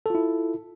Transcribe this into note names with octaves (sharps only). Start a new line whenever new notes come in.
E4 F4 A4